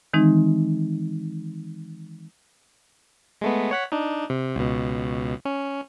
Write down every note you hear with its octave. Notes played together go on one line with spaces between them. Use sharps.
D#3 E3 G#3 C4 D#4
G#3 A3 B3
C#5 F#5 B6
D4 D#4
C3
C#2 B2
C#4